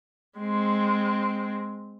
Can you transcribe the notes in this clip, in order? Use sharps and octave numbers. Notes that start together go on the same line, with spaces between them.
G#3 C4